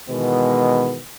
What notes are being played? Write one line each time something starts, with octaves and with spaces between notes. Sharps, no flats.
B2 D#3 E3 G#3 B3